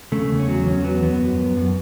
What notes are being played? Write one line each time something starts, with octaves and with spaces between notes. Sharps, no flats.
C#3 A3
E2
C#4
F#3
E2 C#4
F#3 B3
E2 B3
F#2
F#2
F#2